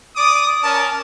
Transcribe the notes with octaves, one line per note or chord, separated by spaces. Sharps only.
D5 D6 D#6
C#4 A#4 A5